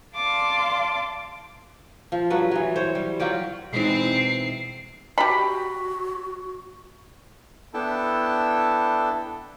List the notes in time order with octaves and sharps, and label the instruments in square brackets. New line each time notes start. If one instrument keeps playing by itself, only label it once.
[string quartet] D5 F5 A5 C6 D6
[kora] F3
G2 F#3 B4
E3 F#3
C5 C#5
G3
F#3 F4 G4 D5
[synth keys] B2 E3 D#4 [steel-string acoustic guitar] G#3 E4 [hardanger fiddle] C4 [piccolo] C7
[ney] F#4 [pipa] G4 B5
[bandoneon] B3 D4 E4 A4 G5 A5